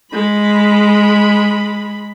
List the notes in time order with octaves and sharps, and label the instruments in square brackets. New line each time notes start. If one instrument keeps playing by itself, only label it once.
[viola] G#3 B5